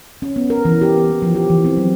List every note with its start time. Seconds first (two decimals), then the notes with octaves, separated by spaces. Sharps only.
0.22 C#4
0.36 B3
0.50 A#4
0.65 E3
0.81 G4
0.97 B3
1.10 A#3
1.22 F3
1.35 G4
1.50 E3
1.65 C4
1.77 F#3